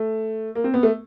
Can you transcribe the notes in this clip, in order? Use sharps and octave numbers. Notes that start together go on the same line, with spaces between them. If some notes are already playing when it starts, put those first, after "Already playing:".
Already playing: A3
A#3
C4
B3
A3